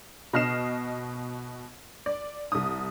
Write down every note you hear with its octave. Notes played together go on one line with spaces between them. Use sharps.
B2 D#5 F6 C7 E7
D5
C2 D#6